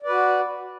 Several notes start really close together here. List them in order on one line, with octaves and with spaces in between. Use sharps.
D5 B4 F#4